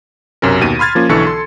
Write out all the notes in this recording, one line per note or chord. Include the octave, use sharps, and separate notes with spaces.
B1 F#2 C3 C#4 A#4
D#2 B2 D#7
B5 C6 F6 G#6 A6
F3 A#3 C#4 F4
B1 D3 E3 A4 C#6 C#7
A4 C6